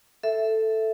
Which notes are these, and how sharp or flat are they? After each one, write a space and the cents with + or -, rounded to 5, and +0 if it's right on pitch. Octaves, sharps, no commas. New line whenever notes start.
A4 +0 E5 +0